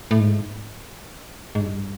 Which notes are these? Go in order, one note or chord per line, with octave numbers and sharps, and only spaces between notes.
A2
G#2
G#2
G2